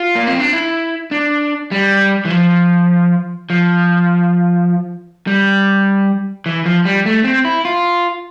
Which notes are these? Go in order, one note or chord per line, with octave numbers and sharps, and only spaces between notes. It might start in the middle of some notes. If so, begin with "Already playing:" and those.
Already playing: F4
A#3
C4
D4
E4
D4
G3
E3
F3
F3
G3
E3
F3
G3
A3
C4
E4
F4